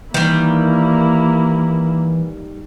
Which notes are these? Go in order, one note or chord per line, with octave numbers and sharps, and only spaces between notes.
D#3 E3 G3 A#3 E4